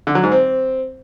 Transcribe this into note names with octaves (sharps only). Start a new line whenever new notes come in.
D3
F#3
G#2
C4